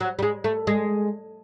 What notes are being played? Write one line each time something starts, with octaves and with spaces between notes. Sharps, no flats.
F#3
G3
G#3
A3
G#3